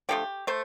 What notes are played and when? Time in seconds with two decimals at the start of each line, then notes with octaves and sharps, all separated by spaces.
0.09 D3 F3 A3 G4
0.47 A3 C5